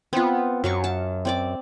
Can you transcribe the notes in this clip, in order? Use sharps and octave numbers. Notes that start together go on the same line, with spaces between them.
B3 C4 F4
F#2 F#3 F5 C#6
A5
C4 D5 D6